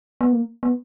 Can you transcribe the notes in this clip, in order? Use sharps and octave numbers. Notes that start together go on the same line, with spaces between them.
B3
A#3
B3